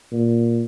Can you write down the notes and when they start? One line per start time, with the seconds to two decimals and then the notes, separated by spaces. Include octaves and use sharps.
0.12 A#2